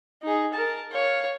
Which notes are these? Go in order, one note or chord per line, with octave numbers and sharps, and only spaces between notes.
D#4 G#4
A#4 A5
C#5 F5